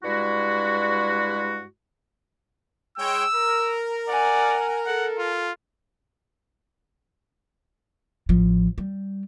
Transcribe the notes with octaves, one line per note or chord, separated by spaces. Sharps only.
G2 G3 G#3 E4 F#4
G#3 C#5 G5 E6
A#4
D5 F#5 G#5
A4 F#5
F4
A1 F3
G3